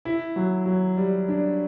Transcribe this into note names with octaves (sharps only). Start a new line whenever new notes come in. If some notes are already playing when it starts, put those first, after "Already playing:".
E4
F#3
F#3
G3
D4